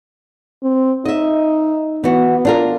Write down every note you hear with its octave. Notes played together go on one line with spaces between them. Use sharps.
C4
D#4 D#5 E5
E3 B3 F#4
D4 F4 A#4